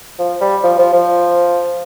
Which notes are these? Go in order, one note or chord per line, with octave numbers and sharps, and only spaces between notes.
F3
G3
F3
F3
F3